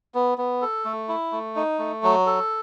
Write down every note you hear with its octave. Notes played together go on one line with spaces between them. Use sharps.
B3
B3
A4
A3
E4
A3
D#4
A3
F#3
A4